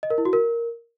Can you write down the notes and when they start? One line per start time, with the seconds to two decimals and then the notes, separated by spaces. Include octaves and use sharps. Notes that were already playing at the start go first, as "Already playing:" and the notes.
0.03 D#5
0.10 A#4
0.18 E4
0.25 F#4
0.33 A#4